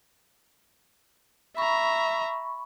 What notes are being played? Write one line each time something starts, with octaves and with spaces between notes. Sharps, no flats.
E5 A#5 B5 C#6